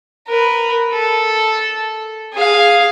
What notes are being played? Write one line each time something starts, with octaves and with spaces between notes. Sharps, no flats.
A#4 B4
A4
G#4 F5